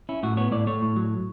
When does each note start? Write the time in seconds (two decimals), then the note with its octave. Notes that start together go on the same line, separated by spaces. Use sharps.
0.09 C#4 E4
0.23 A2 F#4
0.37 B3 C#5
0.52 A2 D5
0.67 A3 C#5
0.82 A2
0.96 F#3